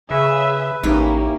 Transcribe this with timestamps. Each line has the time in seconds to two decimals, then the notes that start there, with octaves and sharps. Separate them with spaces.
0.11 C#3 G#4 B4 E5
0.83 A1 A#3 C#4 D#4 E4 G4